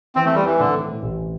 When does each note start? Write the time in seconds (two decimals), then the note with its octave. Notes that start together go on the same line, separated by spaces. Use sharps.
0.15 E3 C4
0.25 A3
0.31 G3 C4
0.45 E3 C4
0.59 A2 D3
0.74 C4
0.88 A2
1.02 A1